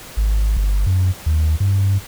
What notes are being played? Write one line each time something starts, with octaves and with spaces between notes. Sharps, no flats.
G#1
G1
F#2
D#2
G2